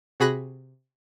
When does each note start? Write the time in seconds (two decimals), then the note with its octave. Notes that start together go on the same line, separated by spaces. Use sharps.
0.20 C3 F#4 G#4 B5 F#6 A#6